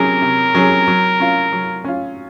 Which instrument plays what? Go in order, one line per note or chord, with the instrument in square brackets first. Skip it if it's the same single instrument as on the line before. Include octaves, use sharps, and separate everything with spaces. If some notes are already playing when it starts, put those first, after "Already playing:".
Already playing: [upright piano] C3 F#3 C#4 G#4 [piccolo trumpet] A#4
[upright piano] C3
F#3 C#4 G#4
F#3
C#4 F4
F#3
C#4 F4